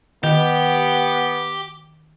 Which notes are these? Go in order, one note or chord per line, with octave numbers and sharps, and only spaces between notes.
D#3 B3 G4